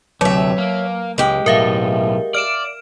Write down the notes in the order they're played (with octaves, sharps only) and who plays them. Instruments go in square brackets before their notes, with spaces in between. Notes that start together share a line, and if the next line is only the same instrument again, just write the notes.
[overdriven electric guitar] D2 C3 [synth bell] F#3 [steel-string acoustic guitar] C#5 E5
[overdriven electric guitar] A#3
[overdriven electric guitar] C#2 [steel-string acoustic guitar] G#3 G4
[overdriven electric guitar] B1 A2 [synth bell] A#4 E5 F5
[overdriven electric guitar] D5 [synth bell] F6 D7 E7